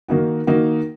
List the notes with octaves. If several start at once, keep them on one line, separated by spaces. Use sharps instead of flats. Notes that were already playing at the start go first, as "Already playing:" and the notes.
D#3 A#3 D#4 F#4
D#3 A#3 D#4 F#4